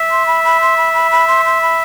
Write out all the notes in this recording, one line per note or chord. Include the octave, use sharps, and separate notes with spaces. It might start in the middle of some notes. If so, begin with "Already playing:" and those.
Already playing: E5
C6
B5
B5
C6
B5
B5
B5
C6
C6
B5